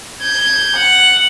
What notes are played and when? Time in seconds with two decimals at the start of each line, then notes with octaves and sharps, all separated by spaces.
0.23 G6 G#6
0.77 F#5